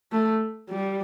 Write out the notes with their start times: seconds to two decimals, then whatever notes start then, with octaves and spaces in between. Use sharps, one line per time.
0.12 A3
0.70 G3